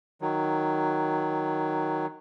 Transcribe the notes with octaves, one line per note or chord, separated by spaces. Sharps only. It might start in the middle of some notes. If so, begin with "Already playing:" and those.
D#3 F#3